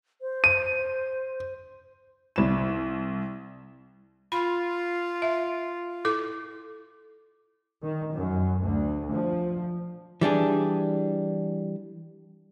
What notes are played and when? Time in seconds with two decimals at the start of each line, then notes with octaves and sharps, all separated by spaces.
0.21 C5
0.44 D#7
2.36 C2 E7
4.32 F4 B5
5.22 E5
6.05 E4 A4 D6
7.83 D#3
8.13 F#2
8.62 D2
9.13 F3
10.21 E3 G3 D4 G#4